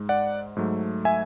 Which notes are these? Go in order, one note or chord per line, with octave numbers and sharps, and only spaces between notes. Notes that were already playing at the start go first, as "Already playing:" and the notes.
Already playing: G#2 G#3
D5 F#5
G#2 F#3 A3
E5 G#5